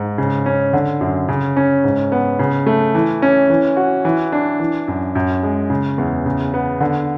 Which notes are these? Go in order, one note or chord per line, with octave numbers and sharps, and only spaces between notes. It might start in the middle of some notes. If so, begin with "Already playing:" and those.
Already playing: G#2
C#3
C#4
D3
F#2
C#3
C#4
G#2
B3
C#3
A3
E3
C#4
E3
F#4
E3
D4
E3
F#2
F#2
G#3
C#3
E2
C#3
B3
D3